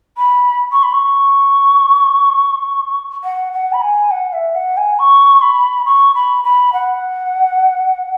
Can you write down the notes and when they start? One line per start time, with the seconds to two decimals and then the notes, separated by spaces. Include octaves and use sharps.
0.18 B5
0.72 C#6
0.83 B5
0.94 C#6
3.24 F#5
3.53 F#5
3.73 B5
3.82 G#5
4.11 F#5
4.33 E5
4.55 F#5
4.77 G#5
4.99 C#6
5.42 B5
5.85 C#6
6.15 B5
6.44 B5
6.73 F#5